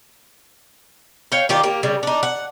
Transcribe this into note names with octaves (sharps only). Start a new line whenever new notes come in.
C#5 F5 G5
D#3 F4 G4 D5
A#3 G4
C#3 G3
D4 D#4
F#5